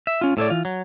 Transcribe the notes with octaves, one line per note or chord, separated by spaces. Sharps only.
E5
C#4 F4
A2 A4 C#5 D5
E3 F4
F#3